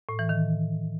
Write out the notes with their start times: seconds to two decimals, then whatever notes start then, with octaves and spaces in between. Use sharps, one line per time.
0.09 A2
0.19 E3
0.29 D#3